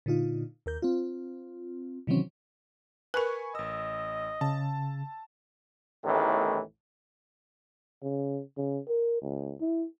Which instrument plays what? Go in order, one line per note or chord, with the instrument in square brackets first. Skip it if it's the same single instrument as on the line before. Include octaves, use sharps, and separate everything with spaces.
[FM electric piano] A#2 D3 D#4 F4
D#2 A#4 G6
C4 F4
C3 D#3 E3 F#3 C4 C#4
[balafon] A#4 B4 [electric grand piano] G#5 B5 C#6
[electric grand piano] A1 E6 [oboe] D#5
[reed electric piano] C#3 [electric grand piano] A5
[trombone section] A1 E2 A2 C3 D#3 E3
[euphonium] C#3
C#3
A#4
C#2
E4